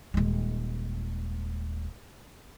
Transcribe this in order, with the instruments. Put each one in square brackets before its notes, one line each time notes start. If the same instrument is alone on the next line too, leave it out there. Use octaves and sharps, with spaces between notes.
[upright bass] D#1 G#3